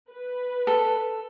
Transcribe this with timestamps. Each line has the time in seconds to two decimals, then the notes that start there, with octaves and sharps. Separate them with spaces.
0.11 B4
0.67 A4